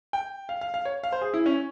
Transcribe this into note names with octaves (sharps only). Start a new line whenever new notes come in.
G5
F5
F5
F5
C#5
F5
C5
G#4
E4
C#4